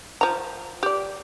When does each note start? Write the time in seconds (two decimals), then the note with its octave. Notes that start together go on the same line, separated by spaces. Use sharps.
0.21 F3 A#5
0.83 G4 D5